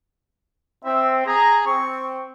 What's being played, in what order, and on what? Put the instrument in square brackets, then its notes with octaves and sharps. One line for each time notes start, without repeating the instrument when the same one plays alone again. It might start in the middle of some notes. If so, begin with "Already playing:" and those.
[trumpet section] C4 [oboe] E5
[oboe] G#4 [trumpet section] A#5
[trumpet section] C4 [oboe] C#6